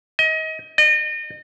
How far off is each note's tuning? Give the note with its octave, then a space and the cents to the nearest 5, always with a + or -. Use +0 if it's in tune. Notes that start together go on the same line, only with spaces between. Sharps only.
D#5 +30
D#5 -35